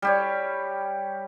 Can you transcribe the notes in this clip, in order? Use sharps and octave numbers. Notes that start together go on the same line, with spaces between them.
G3 G4 C#5